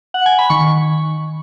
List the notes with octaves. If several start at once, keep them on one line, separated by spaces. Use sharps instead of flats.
F#5
G#5
B5
D#3 C#6